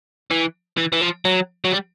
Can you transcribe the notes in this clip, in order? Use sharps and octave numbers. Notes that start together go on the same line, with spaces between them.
E3
E3
E3
F3
F#3
F#3
G3